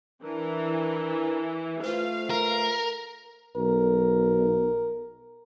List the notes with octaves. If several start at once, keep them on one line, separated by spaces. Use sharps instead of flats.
E3 D4 A#4 B4
A3 F4 B4 C5 F5
A#4
B1 A#4